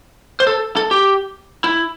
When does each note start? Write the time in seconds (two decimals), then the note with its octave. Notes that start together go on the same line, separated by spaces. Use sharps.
0.40 C5
0.47 A4
0.76 A4
0.91 G4
1.64 E4